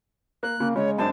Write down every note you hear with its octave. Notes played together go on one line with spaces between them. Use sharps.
A#3 F#6
C#3 A#3
C#3 G#3 C#5
F#2 C4 D4 A5